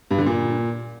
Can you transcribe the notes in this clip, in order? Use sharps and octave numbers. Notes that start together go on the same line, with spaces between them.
G2
D3
A#2